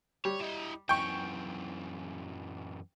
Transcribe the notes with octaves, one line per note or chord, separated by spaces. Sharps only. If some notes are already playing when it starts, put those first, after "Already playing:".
G3 C#5
E4 D#5
F#2 E3 G5 C#6